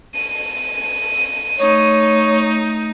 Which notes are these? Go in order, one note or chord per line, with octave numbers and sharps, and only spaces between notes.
D#7
A3 D#4 C#5